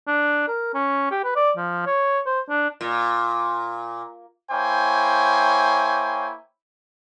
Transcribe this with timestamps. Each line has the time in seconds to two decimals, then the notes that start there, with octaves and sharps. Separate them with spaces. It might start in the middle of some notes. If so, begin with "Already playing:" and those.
0.07 D4
0.47 A#4
0.74 C#4
1.11 G4
1.24 B4
1.36 D5
1.56 F3
1.86 C#5
2.26 C5
2.49 D4
2.81 A#2
4.51 A#3 E4 C5 C#5 G5 G#5